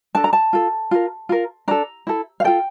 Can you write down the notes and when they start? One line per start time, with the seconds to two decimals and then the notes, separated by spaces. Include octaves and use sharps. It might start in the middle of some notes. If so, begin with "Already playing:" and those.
0.15 D4 A4 A5
0.24 A#5
0.33 A5
0.53 F4 A4
0.91 F4 A#4
1.29 F4 A#4
1.68 D4 A4 A#5
2.07 E4 A4
2.40 F5
2.44 F4 A4 G5